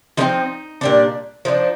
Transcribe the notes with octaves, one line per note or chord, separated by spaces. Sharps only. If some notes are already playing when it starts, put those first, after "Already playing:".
F3 G#3 C4 D#4
A#2 G3 D4
F3 A#3 D4 D#4